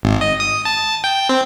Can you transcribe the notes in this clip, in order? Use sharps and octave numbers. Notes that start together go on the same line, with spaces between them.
G#1
D#5
D#6
A5
G5
C4